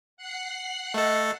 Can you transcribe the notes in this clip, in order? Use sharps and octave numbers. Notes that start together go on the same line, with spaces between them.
F#5 F#6 C7
A3 A4 D#5